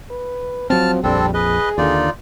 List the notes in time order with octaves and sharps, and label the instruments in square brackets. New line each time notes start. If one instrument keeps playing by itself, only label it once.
[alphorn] B4
[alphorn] F3 [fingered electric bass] F#3 C4 [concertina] A5 F6
[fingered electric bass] A#1 F2 [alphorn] G3 [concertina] C4 D4 A4
[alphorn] G#4 [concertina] B4 D#5
[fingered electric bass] D#2 D3 [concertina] D#4 F4 D5